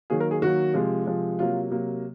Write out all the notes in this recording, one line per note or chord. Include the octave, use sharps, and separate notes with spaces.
D#3 F#3 A#3 G#4
A#4
G#4
D#3 F#3 A#3 F#4
C3 F3 G#3
C3 F3 G#3
C3 F#3 A#3 F4
C3 F#3 A#3